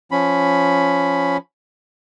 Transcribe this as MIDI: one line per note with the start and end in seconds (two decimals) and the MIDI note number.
0.11 1.37 53
0.11 1.37 61
0.11 1.37 83